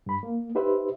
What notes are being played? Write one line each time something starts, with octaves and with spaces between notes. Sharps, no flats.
G2 B5
A#3
D#4 G4 B4 C5 E5